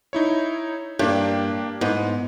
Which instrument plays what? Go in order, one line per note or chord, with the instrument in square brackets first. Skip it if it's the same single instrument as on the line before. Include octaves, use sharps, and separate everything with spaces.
[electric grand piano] D#4 E4 C#5
[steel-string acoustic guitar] G2 [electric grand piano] A#3 D4 G4
[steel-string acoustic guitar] G#2 [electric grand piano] B3